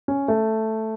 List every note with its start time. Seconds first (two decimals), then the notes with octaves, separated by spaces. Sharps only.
0.08 C#4
0.28 A3